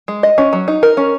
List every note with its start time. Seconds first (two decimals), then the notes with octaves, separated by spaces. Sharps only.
0.08 G#3
0.23 D#5
0.38 C#4
0.53 F#3
0.68 D#4
0.83 A#4
0.97 C#4